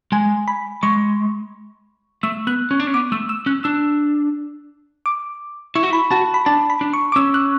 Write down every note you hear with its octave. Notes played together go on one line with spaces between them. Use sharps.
G#3 G#5
B5
G#3 C#6
A3 E6
B3 F#6
C#4
D4
C#4
B3 D6
A3 E6
E6
C#4 F#6
D4 E6
D6
E4 C#6
F#4
E4 B5
F#4 A5
B5
D4 A5
B5
D4
C#6
D6
C#4 E6
F#6